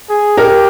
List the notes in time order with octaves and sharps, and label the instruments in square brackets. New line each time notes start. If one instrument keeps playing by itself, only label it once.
[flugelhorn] G#4
[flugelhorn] G4 [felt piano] A#4